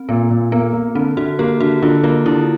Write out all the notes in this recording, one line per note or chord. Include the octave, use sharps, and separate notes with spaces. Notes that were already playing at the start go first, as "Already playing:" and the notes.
Already playing: C4
A#2 B3
A#2
A#3 B3
A#3
D3 C4
D3 F#4
A#3 G4
D3 F#4
D3 F4
A#3 F4
D3 E4